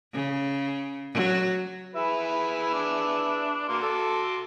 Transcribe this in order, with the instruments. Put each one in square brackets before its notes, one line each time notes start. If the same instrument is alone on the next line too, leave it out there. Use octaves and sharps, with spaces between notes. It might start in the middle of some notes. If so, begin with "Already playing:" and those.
[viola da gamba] C#3
F#3
[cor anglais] E4 [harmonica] G#4 B4 E5
[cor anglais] D4
[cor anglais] A#3 [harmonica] F#4 C6 D6
[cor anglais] A4